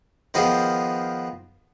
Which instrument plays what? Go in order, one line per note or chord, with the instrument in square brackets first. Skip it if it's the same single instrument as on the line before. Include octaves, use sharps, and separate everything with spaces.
[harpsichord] D#3 F3 B3 F#4 G#4 C5